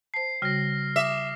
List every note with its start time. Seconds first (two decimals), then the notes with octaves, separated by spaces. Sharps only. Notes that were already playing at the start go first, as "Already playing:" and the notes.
0.14 C5 A5 C7
0.42 C#3 G3 F#4 F6 A#6
0.96 E5 D6 D#6